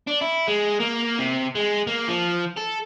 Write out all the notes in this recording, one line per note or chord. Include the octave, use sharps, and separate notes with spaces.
D4
E4
G#3
A#3
C3
G#3
A#3
F3
A4